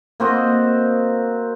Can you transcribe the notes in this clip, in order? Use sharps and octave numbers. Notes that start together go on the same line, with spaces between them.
A#3 C4 F#4 D#5